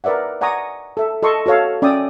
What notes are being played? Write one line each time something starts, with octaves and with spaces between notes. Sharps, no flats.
A#4 B4 D5 E5 F#5
D5 F#5 G#5 A#5 C#6 D#6
A4 E5
A4 D#5 C6 C#6 D#6
F#4 A4 C#5 F5
C#4 D5 E5 G5 D#6 E6